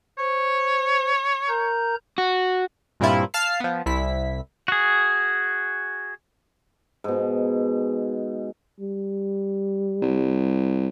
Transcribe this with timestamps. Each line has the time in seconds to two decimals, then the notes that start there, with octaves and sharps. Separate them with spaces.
0.18 C5 C#5
1.48 A#4 A#5 G6
2.18 F#4
3.00 G2 A#2 G3 C4 E4 F4
3.34 F5 A5 F6 C7
3.60 F3 B3
3.86 C2 E4 B6
4.68 F#4 G#4
7.04 G#2 B2
8.81 G3
10.02 C2